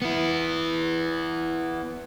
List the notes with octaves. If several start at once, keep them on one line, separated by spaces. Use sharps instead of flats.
B3 E4